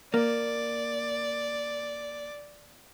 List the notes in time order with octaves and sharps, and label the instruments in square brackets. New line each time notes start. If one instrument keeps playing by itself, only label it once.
[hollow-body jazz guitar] A#3 [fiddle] D5